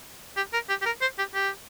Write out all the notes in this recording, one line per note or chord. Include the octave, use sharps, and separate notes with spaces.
G4
A#4
G4
G4
A#4
C5
G4
G4